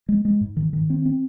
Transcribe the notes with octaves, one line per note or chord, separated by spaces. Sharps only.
G#3
G#3
G#2
D#3
D#3
C4
C4